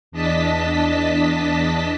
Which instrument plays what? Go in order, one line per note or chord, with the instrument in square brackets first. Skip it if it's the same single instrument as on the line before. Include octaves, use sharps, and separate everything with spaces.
[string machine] E2 D4 D#5 A5 B6